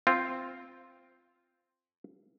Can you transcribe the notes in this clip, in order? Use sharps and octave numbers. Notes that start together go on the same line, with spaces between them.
C4 F4